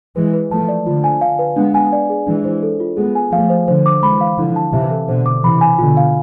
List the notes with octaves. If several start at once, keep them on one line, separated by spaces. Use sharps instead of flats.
E3 G#3 B4
B4
F3 A3 A5
D5
D3 F3 F4
G#5
F5
B4
G#3 B3 D4
G#5
D5
G#4
E3 G#3 D4
C5
A4
F4
G#3 B3 G#4
G#5
F3 A3 F5
C5
D3 F3 C5
D6
E3 G#3 B5
F5
D3 F3 E4
A5
C3 E3 E5
A4
B2 D3 C5
D6
C3 E3 B5
G#5
B2 D3 F4
F5